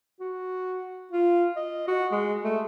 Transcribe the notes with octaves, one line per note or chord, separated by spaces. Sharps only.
F#4
F4
D#5
F#4
G#3
A3